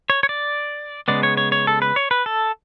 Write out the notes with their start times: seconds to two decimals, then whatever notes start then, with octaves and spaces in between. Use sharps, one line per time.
0.10 C#5
0.23 C#5
0.29 D5
1.08 C#3 G#3 B3 D5
1.23 C#5
1.37 C#5
1.52 C#5
1.67 A4
1.82 B4
1.96 C#5
2.11 B4
2.26 A4